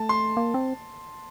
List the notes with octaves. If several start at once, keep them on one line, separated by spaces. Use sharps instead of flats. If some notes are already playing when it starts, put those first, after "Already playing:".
Already playing: A3 A5
C6
A#3
C4